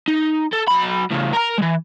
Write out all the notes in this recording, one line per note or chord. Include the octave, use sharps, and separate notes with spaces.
D#4
A4
F#3 B5
A2 C#3
A#4 A#5
E3 G#3